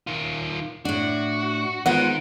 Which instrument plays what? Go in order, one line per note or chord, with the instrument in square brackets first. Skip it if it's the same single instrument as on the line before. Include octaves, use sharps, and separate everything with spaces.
[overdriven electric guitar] D#3 F4
[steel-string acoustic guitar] A2 D4 [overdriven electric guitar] F#4
[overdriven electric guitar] D#3 [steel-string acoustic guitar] G#3 B3 F4 [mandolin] C5 F#5